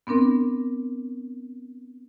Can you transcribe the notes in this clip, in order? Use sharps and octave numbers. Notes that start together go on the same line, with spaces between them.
B3 C4 D4 A#4